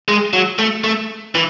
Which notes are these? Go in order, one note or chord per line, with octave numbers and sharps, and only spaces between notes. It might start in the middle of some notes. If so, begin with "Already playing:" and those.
G#3
F#3
A3
A3
E3